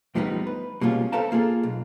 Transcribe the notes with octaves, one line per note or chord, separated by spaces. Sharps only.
E2 A2 F3 G3 B3 D#4
B4
B2 G3 G#3 A#3 C#4 F4
A4 B4 C5 F5 A5 A#5
A#3 F4 G#4 A4
B1